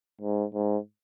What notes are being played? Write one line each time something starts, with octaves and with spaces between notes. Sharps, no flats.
G#2
G#2